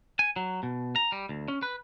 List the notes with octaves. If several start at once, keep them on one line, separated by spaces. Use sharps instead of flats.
G#5
F#3
B2
A#5
G3
D2
C#4
B4